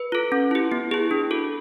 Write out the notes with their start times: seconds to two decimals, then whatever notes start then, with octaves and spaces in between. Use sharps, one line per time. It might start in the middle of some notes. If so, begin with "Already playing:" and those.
Already playing: B4
0.12 F4 A4
0.32 C#4
0.51 E4 G4
0.72 B3
0.91 E4 G#4
1.11 D4
1.31 F#4 A4